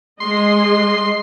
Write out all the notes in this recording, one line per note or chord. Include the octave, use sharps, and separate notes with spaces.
G#3 D#5 C6